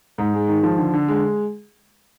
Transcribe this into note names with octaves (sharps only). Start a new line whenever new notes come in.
G#2
G#3
D#3
F3
D3
D3
G#3